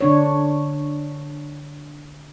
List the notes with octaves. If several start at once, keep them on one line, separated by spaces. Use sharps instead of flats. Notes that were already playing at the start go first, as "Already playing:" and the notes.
D3 D4 C#5